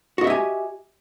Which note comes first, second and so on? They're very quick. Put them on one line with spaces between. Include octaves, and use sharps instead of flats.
F#4 D#5 E5 G4 G#5